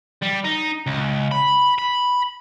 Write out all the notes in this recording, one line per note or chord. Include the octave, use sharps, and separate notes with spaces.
G3
D#4
C#2
B5
B5